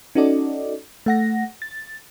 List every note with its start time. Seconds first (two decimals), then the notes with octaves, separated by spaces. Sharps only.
0.15 C#4 D#4 F#4 A4 D5 D#5
1.06 A3 F#5 A#6
1.62 A6